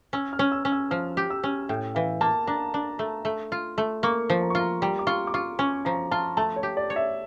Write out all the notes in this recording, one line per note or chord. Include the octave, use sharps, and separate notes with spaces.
C#4 E6
F6
C#4
E6
C#4
E6
F3 F6
G4
E6
C#4
A2 G5
E3 F5
A#3 A5
D4 A#5
D4
A3
A3
F4
A3
A#3 C#6
F3
A#5
C#6
F4 A#5
G3 A#5
D6
F4 C#6
D6
F4 C#6
C#4 C#6
F3 A#5
F4 A5
A3 A5
C#5
G4
D5
C#5
E5